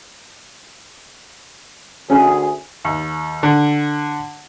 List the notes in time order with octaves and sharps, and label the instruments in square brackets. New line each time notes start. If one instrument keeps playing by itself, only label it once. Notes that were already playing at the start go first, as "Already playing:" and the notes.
[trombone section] D2 G#4 [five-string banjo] C#4
[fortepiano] D#2
D3